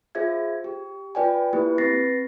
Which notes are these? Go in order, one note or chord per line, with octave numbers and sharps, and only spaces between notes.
F4 G#4 C5 E5 G#6
G4
F4 B4 D5 G5 G#5
A#3 E4 G4 B4
C4 B4 A6 A#6 C7